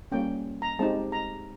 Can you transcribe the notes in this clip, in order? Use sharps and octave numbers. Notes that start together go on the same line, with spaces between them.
G3 A#3 C#4 G5
A#5
G#3 C4 D#4 G4 A5
A#5